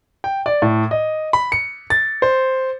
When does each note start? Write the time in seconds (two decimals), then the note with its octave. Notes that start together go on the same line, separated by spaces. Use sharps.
0.24 G5
0.46 D5
0.62 A2
0.91 D#5
1.33 B5
1.52 C#7
1.90 A6
2.22 C5